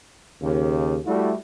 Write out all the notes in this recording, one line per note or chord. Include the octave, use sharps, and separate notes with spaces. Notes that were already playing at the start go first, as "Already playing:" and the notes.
D#2 C#3
G3 A3 E4 F#4